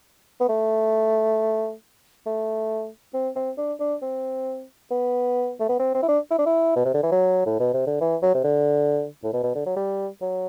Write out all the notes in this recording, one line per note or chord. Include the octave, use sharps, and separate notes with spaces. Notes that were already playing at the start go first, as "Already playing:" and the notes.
B3
A3
A3
C4
C4
D4
D4
C4
B3
A3
B3
C4
C4
E4
D4
E4
D4
E4
B2
C3
D3
E3
F#3
A2
B2
C3
D3
E3
F#3
C3
D3
A2
B2
B2
D3
F#3
G3
F#3